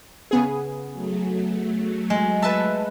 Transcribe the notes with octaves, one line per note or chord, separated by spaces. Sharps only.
C#3 B3 G#4
F#3 A3
G#3
B4 E5 A5